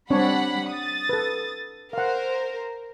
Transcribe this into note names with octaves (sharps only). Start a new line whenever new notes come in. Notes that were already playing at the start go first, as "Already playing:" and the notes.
G3 C4 D4 C#5 F#5 B5
D#6 A6
A4 B4
A#4 C5 F5 F#5